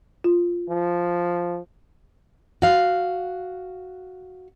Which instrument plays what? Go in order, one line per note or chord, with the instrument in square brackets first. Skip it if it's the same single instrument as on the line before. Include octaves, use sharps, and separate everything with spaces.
[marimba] F4
[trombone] F3
[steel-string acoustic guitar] F#4 F5